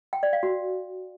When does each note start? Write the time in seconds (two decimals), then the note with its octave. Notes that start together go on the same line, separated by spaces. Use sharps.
0.13 G5
0.23 D5
0.33 F5
0.43 F#4